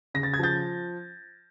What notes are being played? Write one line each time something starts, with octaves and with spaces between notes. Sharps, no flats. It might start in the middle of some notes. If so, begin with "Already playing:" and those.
C#3 A#6
A6
G#6
F3 G6 A6